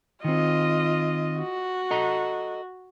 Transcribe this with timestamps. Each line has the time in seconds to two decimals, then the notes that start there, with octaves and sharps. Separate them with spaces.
0.24 D#3 C4 F4 D#5
1.38 F#4
1.91 A4 D#5 A#5